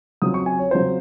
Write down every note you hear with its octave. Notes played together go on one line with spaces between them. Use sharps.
C#3 F#3 C4 F4 D#6
C#6
G#5
C#5
C#3 F#3 C4 F4 C5